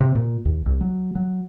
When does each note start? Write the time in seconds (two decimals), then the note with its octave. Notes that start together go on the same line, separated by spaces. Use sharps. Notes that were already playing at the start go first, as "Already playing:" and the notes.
0.01 C3
0.15 A#2
0.45 D#2
0.66 C2
0.81 F#3
1.15 F#3